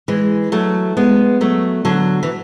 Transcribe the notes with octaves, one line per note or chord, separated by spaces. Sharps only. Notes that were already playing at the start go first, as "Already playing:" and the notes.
E3 G#3
F#3 A3
G#3 B3
F#3 A3
D3 F#3
E3